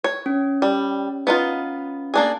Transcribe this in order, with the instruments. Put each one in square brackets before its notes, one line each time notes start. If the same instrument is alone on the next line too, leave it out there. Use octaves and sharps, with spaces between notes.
[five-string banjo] C#5
[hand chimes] C#4
[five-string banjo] G3
B3 D#4 F4
A#3 D4 G#4